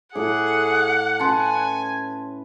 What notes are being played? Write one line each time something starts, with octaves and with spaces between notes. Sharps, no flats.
A2 G#4 F#5 D6
C#4 B4 G#5 A5 C6